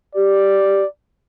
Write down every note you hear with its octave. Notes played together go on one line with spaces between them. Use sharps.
G4 D5